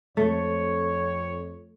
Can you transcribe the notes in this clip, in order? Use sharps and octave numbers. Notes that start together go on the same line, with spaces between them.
F2 A3 C#5